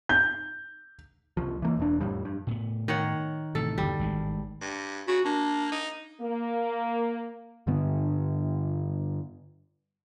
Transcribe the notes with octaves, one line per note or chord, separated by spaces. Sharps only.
G6
C2 F3
E3 A3 A#3
E1 E2 D4
F2 A2 F3 G3
G2
A2 B3
D#3 C#5 F#5
A2 C3 E3 A4
G1 E2 G3
G#1 A2 G#3
G2
C#3 F#4
A#3 D4
D#4
A#3
G2 D3 B3